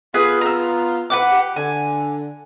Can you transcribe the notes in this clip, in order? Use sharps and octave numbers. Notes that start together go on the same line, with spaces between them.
B3 F4 G#4 B4
A#5 E6
C3 C4 E4 B4 F#5 D6
G4
D3 G#5